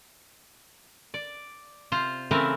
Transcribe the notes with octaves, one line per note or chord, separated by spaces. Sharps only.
D5
C3 F4 C5
C#3 E3 A3 C4 A#4 B4